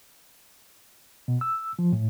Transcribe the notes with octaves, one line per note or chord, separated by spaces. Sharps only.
B2
E6
F3
A2